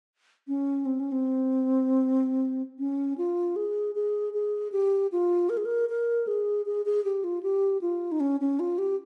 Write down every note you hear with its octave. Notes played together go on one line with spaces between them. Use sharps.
C#4
C4
C#4
C4
C#4
F4
G#4
G#4
G#4
G4
F4
A#4
G#4
A#4
A#4
G#4
G#4
G#4
G4
F4
G4
F4
D#4
C#4
C#4
F4
G4